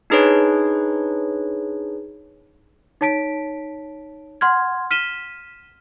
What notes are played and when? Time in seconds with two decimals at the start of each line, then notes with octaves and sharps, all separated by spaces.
0.10 D4 D#4 G#4 B4 C#5
3.01 D#4 C#5 A5 B6 D7
4.41 F#5 C6 F6 G#6
4.91 F6 B6 D#7 E7 G7